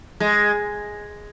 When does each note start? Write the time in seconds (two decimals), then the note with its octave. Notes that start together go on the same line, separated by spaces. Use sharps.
0.20 G#3